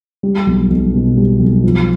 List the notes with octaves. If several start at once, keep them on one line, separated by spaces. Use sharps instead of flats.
G3
B1
B1
B2
G3
B1
F3